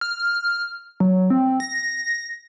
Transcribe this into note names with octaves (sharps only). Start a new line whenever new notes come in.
F6
F#3
C4
A#6